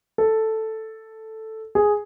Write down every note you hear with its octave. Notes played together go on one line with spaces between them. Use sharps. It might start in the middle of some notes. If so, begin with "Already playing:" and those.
A4
G#4